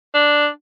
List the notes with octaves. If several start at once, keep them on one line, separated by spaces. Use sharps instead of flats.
D4